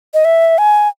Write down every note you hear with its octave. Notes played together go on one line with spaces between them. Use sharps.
D#5
E5
G#5